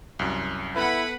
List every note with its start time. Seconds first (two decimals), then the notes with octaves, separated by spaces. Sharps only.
0.19 C2 F#2
0.75 B3 E4 A4 B4 F#5 B5